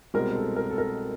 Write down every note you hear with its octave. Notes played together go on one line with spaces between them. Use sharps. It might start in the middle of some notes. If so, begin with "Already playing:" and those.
C2 B2 G#3 C4 A#4
A4
A#4
A4
A#4